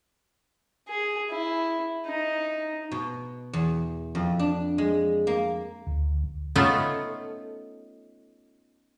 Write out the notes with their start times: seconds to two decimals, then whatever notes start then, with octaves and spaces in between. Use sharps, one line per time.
0.88 G#4
1.30 E4
2.06 D#4
2.91 B2
3.53 E2
4.15 F2
4.39 D4
4.78 G#3
5.27 A#3
5.87 D2
6.56 A3 B3 C#4 D#4 F4 A4